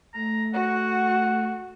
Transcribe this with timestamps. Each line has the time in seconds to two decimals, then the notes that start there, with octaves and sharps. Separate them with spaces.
0.14 A3 A#5
0.54 F#4 F#5